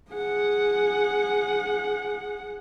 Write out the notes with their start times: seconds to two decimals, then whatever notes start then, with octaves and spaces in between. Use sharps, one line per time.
0.11 G#4 F#5